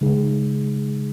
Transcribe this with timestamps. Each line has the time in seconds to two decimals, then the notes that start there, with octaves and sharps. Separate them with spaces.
0.01 C#3 G#3 D#4 G#4